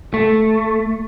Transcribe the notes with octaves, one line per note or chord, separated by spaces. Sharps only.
A3